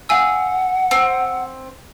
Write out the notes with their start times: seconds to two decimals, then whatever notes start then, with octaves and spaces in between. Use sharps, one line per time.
0.09 F5 F#5 G#5 E6
0.91 C4